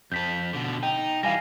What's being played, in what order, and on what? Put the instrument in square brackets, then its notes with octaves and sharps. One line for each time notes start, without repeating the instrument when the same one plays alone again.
[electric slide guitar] F2 A4 [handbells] G6 B6
[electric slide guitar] B2 D3
[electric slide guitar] D#4 [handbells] G5
[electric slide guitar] E3 G3 [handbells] F5 G#5 A#6